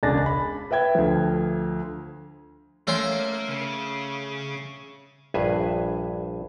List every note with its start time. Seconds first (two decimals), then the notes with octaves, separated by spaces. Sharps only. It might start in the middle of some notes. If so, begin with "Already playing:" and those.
0.03 E1 C#2 D4 G#5 A6 A#6
0.26 B5
0.71 B4 E5 G5 G#6
0.95 D2 F3
2.87 A3 A#3 C#4 C6
3.48 C#3
5.34 A#1 G2 G#4 B4 E5 G#5